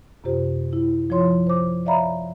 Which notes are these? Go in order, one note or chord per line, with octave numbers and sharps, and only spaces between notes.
F#2 C3 F4 G4 C5
E4
F3 F4 C#5 C6
C5 D6
C#5 D5 E5 F5 A#5 B5